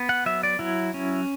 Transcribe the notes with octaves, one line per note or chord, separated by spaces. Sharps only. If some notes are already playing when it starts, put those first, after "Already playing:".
Already playing: B3
F#5
F#3 E5
D5
F#3 E4
C#4